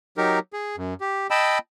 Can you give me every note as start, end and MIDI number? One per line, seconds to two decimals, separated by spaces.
0.17 0.39 54
0.17 0.39 63
0.17 0.39 67
0.17 0.39 70
0.53 0.76 68
0.77 0.94 42
1.01 1.27 67
1.31 1.58 75
1.31 1.58 79
1.31 1.58 81
1.31 1.58 83
1.31 1.58 88